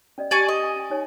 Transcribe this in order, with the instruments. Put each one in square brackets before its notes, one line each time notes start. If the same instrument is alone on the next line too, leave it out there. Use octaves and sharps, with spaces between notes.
[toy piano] C#4 D5 D#5
[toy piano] G4 A5 [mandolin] D5 G#5 C#6
[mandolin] D#5
[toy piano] G#5
C#4 G#5
D#4 C#5 G#5